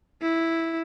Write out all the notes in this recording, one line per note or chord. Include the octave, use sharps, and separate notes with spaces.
E4